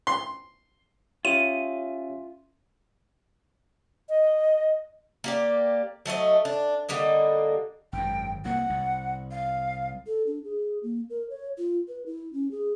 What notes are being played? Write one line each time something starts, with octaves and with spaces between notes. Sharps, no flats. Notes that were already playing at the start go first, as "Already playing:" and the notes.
C6
C#4 F4 G4 C#5 E5 D#7
D#5
A#3 G4 D5
F#3 A3 C#5 D#5
D4
D3 G3 A#3 D#5
G#1 F#2 G5
C2 A#3 F#5
C2
F5
A4
D4
G#4
A#3
A#4
C#5
F4
B4
E4
C#4
G#4